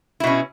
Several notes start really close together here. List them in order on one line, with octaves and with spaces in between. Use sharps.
E4 B2 C#4